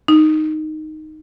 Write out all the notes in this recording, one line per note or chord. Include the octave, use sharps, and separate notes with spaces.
D#4